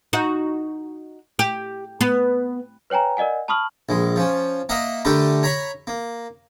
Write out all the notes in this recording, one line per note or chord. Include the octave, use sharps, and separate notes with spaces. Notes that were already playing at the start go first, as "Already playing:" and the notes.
D#4 F#4
G4
B3
B4 C#5 G5 G#5 A#5
A#4 D5 D#5 F#5 G#5
A5 B5 C#6 D#6 F6 F#7
A#1 G#3
F3 C#4
A#3 A#4 D#5 E5 F#5
D3 G3 A3 D4 G4 A#4
C#5 A#5 B5 C#6
A#3